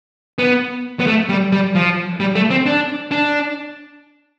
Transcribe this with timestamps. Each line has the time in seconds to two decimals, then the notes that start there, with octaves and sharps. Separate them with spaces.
0.39 B3
0.99 B3
1.07 A3
1.29 G3
1.52 G3
1.75 F3
2.20 G3
2.35 A3
2.51 C4
2.66 D4
3.11 D4